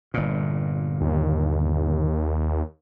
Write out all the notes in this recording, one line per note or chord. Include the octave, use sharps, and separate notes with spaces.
G1 A#2
D#2